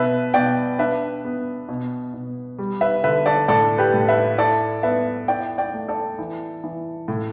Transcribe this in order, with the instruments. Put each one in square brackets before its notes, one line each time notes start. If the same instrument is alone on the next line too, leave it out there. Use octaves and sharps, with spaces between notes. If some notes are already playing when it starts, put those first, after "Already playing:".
Already playing: [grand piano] B2 B4 E5
B2 D5 G5
D4 B4 E5
B3
B2
B2
G3
B4 E5
D3 B4 E5
A4 D5
A2 A4 D5
G4 B4
A2
B4 E5
E4 A4 D5
B3 B4 E5
E4 D5 G5
D5 G5
A3
A4 D5
E3
E3
A2